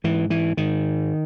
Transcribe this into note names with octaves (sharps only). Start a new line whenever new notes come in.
G#2 E3
E3
G#2 D#3